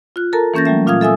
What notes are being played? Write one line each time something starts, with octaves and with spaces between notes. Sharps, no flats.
F4 F#6
A4 A#4 A5 A#5
E3 A#3 C#4 G6 A6 A#6
F#3 G3 A3 E5
A#2 F4 F5 D#6 F6 G#6
A4 E5 G#5 D#6 E6